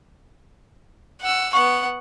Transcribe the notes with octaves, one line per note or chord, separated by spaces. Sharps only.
F#5 E6
B3 F#5 C#6